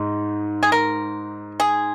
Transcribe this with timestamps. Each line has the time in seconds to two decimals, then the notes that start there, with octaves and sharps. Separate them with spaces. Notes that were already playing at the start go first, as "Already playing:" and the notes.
Already playing: G#2 D#4
0.63 G#4
0.72 A#4
1.60 G#4